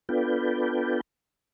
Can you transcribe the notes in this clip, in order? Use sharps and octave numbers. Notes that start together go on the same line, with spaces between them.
B3 D4 F4 A4 B4 G5